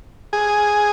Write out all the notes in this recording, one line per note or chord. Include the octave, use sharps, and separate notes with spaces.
G#4